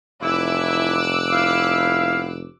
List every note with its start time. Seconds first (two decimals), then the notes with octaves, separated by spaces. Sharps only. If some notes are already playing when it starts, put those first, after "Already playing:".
0.23 F1 E3 E4 D6 E6 F#6
1.32 B3 E4 F5